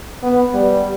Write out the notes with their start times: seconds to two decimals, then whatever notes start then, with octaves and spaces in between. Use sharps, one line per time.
0.23 B3
0.54 G3